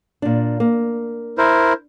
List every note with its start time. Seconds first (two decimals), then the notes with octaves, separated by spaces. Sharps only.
0.22 A#2 D4
0.60 A#3
1.38 E4 A#4 C5